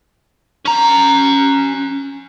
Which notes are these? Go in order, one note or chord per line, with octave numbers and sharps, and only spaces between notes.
C#4 A#5